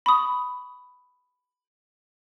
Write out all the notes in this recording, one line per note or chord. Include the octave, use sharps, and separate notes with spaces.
B5 C#6 D#6